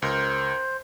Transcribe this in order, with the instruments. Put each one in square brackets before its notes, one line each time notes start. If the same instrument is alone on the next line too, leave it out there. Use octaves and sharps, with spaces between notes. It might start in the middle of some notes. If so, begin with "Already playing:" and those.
[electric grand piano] C#2 A#4 G6 [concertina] C5